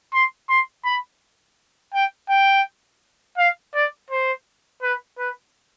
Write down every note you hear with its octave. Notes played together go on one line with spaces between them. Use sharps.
C6
C6
B5
G5
G5
F5
D5
C5
B4
B4